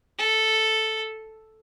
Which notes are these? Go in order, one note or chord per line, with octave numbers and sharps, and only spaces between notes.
A4